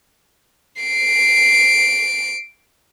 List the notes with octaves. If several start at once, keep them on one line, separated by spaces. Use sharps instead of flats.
C7 D7